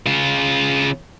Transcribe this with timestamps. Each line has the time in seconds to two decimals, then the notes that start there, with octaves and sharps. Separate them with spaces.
0.06 C#3 F4